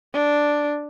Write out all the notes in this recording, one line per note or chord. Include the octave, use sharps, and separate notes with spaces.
D4